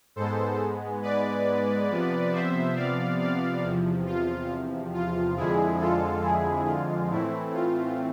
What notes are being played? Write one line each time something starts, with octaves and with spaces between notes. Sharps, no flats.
G#2 G#3 B3 A4 C5
B4 D5
C3 F3 B3
C5 E5
D5 F5
D5 F5
E2 C3 F3
F4
F4
F2 D3 F3 G#3 E4 G#4
F4 A4
E4 G#4
F4
A2 E3 A3 C4 E4
F4